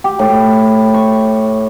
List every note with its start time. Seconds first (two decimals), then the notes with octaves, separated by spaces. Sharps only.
0.04 G4
0.19 A2
0.94 C#6